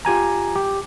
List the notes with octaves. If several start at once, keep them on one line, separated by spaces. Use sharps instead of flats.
F4 G4 G#5 A#5
G4